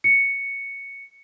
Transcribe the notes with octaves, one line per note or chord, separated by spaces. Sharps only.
C#7